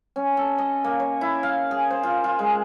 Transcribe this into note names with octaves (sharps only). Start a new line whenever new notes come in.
C#4
A4
D#5
A#3
C#5
E4
F5
G#4
C5
F4
F4
G#3